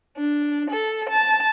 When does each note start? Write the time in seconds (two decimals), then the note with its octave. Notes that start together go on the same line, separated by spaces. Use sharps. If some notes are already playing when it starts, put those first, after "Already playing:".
0.17 D4
0.70 A4
1.08 A5